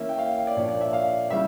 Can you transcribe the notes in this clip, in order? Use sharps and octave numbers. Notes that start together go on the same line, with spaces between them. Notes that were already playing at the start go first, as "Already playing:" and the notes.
Already playing: E3 A#3 C#4 E5
G5
F5
F5
D5
A#2 F3 A#3 D4 C#5
D5
E5
F5
C#3 E3 G3 E5